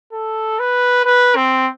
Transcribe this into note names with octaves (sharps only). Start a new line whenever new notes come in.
A4
B4
B4
C4